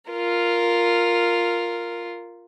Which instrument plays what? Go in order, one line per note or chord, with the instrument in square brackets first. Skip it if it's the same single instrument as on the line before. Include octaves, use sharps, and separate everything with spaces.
[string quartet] F4 A#4